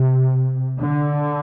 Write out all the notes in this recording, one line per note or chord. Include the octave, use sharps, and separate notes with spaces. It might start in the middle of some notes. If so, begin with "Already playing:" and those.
Already playing: C3
D3